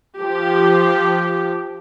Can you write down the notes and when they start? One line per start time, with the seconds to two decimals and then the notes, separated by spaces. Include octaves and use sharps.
0.17 F3 G4